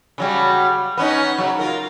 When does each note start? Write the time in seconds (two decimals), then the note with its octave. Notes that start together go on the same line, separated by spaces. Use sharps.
0.18 C#3 F#3 G3
0.97 B3 C#4 D#4
1.38 C#3 F#3
1.59 F4 A#4